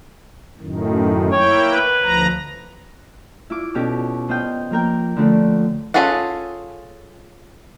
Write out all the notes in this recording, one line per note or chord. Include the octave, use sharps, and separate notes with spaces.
F#2 A2 D#3
A#3 E4 C#5 G5
B4
D2 F3 A#5
E4 F4 D6
B2 C#4 G4 A4 D6
B3 C5 D#5 F5 G5
F3 A#3 A#4 G5
D3 F3 A3 C#4 D4
C#4 F4 G#4 A4 F#5